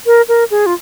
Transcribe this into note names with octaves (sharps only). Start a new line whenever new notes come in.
A#4
A#4
G#4
F4